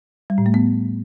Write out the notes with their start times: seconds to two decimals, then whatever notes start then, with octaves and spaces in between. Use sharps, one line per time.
0.30 G3
0.38 A2
0.46 A3
0.54 B3